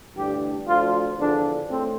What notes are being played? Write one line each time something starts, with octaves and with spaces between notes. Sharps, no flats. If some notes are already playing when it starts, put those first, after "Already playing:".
A1 G2 D3 G4
D2 D3 F3 F4
E2 D3 F3 D4
A2 C4